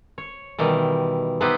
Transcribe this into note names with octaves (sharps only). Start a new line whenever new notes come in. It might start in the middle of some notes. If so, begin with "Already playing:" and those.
C#5
B2 D#3 E3 G3
B3 D#4 E4 G4 B4 C5